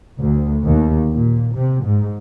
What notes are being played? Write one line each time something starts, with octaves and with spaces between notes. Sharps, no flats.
D2
D#2
A#2
C3
G#2